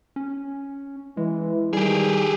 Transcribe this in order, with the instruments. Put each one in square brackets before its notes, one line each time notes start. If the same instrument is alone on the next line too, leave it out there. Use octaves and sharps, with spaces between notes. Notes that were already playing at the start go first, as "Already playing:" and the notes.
[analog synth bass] C#4
[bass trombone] E3 [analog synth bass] G#3
[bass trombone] D#3 [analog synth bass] G3 [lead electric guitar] G4 G#4